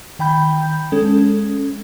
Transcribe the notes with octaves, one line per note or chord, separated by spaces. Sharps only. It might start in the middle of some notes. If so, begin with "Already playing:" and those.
D#3 G5 B5 G6
G#3 C#4 A4